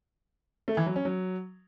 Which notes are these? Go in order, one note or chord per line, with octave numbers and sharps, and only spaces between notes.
A3
E3
F#3
C#4
F#3